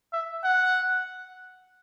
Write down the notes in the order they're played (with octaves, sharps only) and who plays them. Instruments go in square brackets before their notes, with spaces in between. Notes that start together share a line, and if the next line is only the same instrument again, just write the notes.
[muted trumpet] E5
F#5